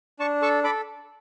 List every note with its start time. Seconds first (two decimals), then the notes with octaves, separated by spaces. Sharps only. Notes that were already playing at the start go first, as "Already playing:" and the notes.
0.19 D4 A5 C#6
0.42 A4 A5 C#6
0.64 A4 B5 D6